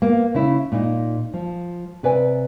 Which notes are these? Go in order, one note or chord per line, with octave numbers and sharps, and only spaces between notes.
A#3 B3
C#3 E4
A#2 D#4
F3
C3 B4 D5 G#5